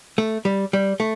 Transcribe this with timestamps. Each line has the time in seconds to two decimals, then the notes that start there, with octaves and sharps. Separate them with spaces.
0.18 A3
0.45 G3
0.73 G3
1.00 A3